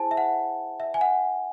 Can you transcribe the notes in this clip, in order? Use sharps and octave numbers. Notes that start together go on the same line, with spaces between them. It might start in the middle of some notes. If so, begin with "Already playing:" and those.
Already playing: E4 G#4 C5 G#5 A5
E5
F#5
E5
G#5
F#5